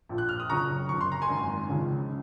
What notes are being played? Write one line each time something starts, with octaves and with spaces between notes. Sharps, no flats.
A#1 A#2 F3
F#6
F6
D#6
F#1 F2 C#3 F#3 A#5 C#6
F#1 F2 C3 C#6
C6
A#5
G#5 C6
G#1 F#2 D#3 F#3
C#2 C#3 F3